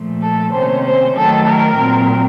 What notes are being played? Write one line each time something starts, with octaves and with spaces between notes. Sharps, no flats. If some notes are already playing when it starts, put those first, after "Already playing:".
Already playing: A#2 F3 A3
A4
C3 D#3 A#3 C#4 C5
C5
D#3 F#3 A3 A4
A#4
A#2 F#3 C4